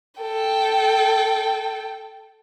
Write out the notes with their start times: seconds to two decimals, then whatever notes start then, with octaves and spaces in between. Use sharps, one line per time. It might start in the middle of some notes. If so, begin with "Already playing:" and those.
0.21 A4 G5